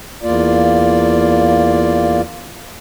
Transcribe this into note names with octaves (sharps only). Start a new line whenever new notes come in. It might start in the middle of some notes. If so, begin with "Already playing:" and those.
E2 A#3 F4 D5